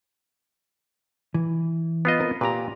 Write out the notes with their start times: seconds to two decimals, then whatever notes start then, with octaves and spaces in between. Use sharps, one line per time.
1.34 E3
2.05 B3 F4 D#5
2.20 C4 A#4
2.41 A#2 G4 B4 A#5